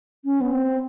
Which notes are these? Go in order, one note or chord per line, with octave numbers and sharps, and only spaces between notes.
C#4
B3
C4